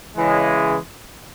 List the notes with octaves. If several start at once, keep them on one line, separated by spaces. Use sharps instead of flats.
C#3 E3 G#3